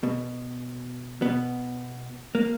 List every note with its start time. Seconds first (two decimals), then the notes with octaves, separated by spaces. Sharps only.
0.03 B2
1.22 B2 B3
2.35 A#3